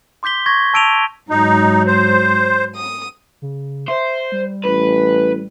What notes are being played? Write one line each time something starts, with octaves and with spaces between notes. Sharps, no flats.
C6 D6 G6 B6 G7
C#6 G#6 A#6
A5 E6 D7 D#7 F7 G7
G#2 F#3 D#4
C5
D#6
C#3
C5 E5
G3
A1 B4